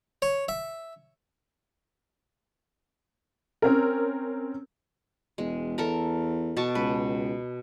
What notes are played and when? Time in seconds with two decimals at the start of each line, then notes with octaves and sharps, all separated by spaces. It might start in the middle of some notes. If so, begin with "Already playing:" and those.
0.22 C#5
0.49 E5
3.62 C4 C#4 A#4
5.38 E1 G#3
5.78 E2 A4 A#4 A#5
6.57 B2 A5 C#6
6.75 C#2 B4